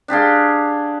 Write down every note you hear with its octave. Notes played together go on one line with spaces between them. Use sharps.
D4 G4 G#4 F5